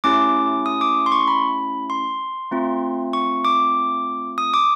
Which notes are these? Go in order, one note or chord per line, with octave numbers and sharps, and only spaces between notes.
A3 C#4 E4 G4 D6
D#6
D6
C6
C#6
B5
C6
A3 C4 F4
C#6
D6
D#6
D6